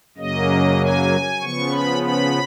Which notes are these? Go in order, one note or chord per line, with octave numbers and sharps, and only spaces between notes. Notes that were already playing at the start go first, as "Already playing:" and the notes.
F#2 C#3 F#3 A#3 D#5
G#5
C#3 F3 B3 C#6
B5
B5